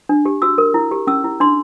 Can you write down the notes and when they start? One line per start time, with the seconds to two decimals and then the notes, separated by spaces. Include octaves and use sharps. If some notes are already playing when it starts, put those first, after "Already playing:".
0.09 D4
0.25 G4
0.42 F#4 E6
0.58 A#4
0.74 E4
0.91 G4
1.07 C#4 E6
1.24 E4
1.40 D4 C6